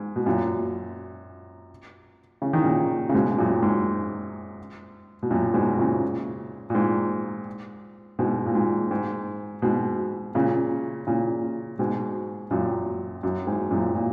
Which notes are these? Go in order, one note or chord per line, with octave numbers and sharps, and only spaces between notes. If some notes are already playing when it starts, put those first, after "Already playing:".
Already playing: G#2
B2
F#2 A#2
C#3
D#3
A#2 C#3
C#3
G#2 B2
F#2 A#2
G#2
B2
F#2 A#2
G#2 B2
A#2 C#3
A#2
G#2
G#2 B2
A#2
G#2
G#2
G#2 B2
A#2 C#3
A#2 C#3
G#2 B2
F#2 A#2
F#2
G#2
F#2 A#2
A#2